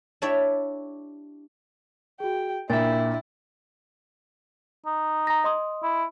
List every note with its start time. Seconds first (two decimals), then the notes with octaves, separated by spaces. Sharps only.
0.22 D4 E4 G4 C#5 D5 E5
2.20 F#4 G#4 G5
2.70 A#2 D4 E4 E5 G5 A6
4.86 D#4
5.27 A#5 A#6
5.44 D#5 C6 D#6
5.83 E4